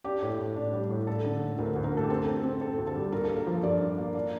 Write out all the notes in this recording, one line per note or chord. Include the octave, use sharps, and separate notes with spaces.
D4 G4
A2
A2
D4
G3
A2
D4 A4
D3
A3
D2 A#4
D2
A#4
A3 A4
G4
C4 A4
C4
C4
C4 A4
D2
A4
G3
G2 A#4
A#3 A4
A#4
F3
G2 D5
D4
A#3
D4